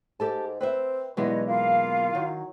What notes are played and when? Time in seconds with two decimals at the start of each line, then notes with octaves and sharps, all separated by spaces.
0.20 G#2 G4 A4 A5
0.61 C4 B4 C5 E5
1.17 B1 G2 E3 G#3 B3 C#5 D#5
1.48 A#3 F4 F5
2.15 D#3 F#3